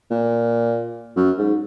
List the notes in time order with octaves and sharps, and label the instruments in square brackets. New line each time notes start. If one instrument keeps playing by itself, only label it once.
[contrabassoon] A#2
F#2
G#2